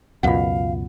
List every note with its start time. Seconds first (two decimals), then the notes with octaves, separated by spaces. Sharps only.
0.23 C#2 F#2 B2 F4 F5 F#5